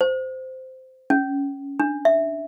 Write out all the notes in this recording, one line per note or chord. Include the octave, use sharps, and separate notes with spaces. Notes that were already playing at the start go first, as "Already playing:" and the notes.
C5
C#4
D4
E5